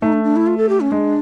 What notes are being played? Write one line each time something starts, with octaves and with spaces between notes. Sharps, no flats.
A3 D#4
D4
D4
E4
F4
A4
G4
C#4
G#3 D4